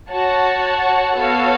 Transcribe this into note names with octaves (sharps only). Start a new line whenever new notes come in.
F#4 C#5 F#5 A5
B3 F#4 A4 C#5 F5